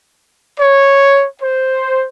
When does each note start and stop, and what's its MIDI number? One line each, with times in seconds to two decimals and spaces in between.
0.59 1.26 73
1.42 2.06 72